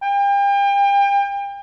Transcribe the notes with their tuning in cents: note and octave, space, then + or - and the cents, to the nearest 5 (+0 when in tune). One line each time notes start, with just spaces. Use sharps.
G5 +35